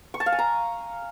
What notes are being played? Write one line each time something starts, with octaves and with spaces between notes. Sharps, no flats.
C#6
A5
F5
G#5
A#5